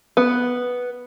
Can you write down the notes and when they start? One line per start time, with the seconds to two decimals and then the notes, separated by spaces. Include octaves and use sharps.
0.17 B3